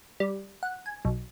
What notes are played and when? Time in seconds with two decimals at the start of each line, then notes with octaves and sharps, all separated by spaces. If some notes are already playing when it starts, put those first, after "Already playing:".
0.20 G3
0.63 F#5
0.86 G#5
1.05 B1